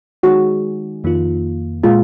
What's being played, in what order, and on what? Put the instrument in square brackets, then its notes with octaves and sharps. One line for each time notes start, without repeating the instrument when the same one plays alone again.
[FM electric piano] D#3 G#3 D#4 G#4 [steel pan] F#4
[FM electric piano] F2 D#3 A#3 F4
[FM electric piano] A#2 G#3 [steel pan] F4